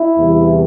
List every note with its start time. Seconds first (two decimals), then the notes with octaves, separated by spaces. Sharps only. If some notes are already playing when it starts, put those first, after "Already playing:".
Already playing: E4
0.17 E2 C3 E3 G3